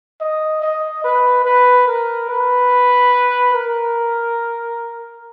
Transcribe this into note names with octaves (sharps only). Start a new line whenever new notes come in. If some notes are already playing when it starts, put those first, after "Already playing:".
D#5
D#5
B4
B4
A#4
B4
A#4